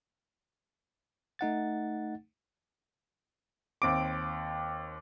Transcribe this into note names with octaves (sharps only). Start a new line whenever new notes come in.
A3 D#4 F#5 A6
D#2 C4 D6 D7